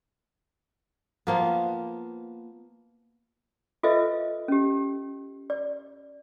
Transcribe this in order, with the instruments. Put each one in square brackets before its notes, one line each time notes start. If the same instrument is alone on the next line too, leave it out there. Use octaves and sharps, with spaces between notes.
[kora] F3 A#3 B3
[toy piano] F4 A4 B4 C5 D#5 E5
C#4 G4
D5